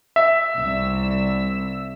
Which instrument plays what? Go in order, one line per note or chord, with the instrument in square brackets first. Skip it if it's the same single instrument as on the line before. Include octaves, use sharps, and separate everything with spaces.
[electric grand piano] E5
[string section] C2 E6